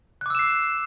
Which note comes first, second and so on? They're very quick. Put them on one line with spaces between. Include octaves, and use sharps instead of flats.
F#6 D6 E6 E7 C7